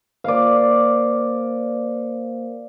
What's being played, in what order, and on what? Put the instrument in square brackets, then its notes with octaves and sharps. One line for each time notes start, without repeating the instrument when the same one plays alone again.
[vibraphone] A#3 A#4 C5 [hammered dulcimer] D5 F5